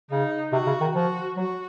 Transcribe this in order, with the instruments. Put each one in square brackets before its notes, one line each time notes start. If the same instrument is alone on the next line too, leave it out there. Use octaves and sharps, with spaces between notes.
[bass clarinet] C#3 [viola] D#4
[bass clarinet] C3 [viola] F#4
[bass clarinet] C#3
D#3
[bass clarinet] F3 [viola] F#4
[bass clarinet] F#3 [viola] F#4